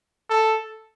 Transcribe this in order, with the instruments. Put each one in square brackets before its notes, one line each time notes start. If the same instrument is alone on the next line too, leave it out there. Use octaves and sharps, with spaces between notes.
[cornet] A4